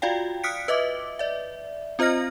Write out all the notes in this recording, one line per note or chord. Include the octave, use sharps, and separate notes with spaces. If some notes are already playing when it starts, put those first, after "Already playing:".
F4 F#4 D5 F5 G5
D#6 F6 F#6 B6 C#7 D7
B4 D#5 E5 D6
D5 E5
C4 F4 C5 D#5 F6 A#6